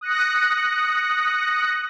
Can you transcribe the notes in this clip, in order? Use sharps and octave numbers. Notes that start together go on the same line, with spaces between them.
D#6 F#6 A#6 C#7